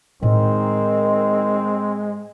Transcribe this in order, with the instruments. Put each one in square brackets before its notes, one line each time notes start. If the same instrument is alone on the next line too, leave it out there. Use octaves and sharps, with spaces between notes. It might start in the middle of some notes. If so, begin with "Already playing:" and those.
[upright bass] A2 D#4 [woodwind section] D#3 [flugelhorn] G#3 [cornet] C4